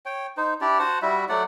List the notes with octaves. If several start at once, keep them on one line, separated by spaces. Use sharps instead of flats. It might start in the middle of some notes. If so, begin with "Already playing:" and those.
C#5 G5
D#4 C5
D4 E4 G4 D5
F#4 C5 F#5 A5
G3 E4 F#4 E5
F#3 A3 D5 F#5